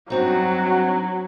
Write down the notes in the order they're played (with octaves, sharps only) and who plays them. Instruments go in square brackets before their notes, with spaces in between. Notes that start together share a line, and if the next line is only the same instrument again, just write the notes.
[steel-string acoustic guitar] G2 C4 D#4 [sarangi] F#3 [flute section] F#4